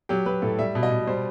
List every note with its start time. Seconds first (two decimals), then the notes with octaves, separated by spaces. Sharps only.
0.09 F#3 G4
0.26 F#3 B4
0.42 A2 A4
0.59 G3 E5
0.75 B2
0.83 D#5
0.92 B2
1.07 G3 C5